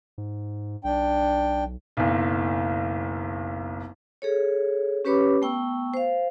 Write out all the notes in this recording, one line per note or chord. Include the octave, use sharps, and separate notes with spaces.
G#2
B1 D4 G5
F#1 B1
G#4 A4 C#5
C#4 G4 B4 C#5 B5 D6
A3 B3 G5 C#6 E6
C5 F5